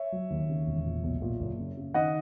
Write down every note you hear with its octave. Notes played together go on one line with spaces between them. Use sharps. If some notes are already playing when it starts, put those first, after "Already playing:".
Already playing: C#5 E5
F#3
D#2
C#3
E1
A#2
B1
A#2
F#1
C#3
C#3
D#3 D#5 F#5